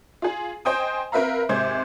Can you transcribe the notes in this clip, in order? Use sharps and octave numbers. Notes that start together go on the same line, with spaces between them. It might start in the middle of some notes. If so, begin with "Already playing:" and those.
F4 G#4
C5 D#5 G5 G#5 D#6
C4 A#4 B4 E5 F5 A#5
G#1 C3 G#3 C5 G6 G#6